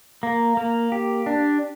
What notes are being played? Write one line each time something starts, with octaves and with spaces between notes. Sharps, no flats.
A#3
A#3
G4
D4